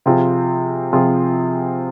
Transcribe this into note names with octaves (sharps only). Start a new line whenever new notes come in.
C3 F3 C4 F4 G#4
C3 F3 C4 F4 G#4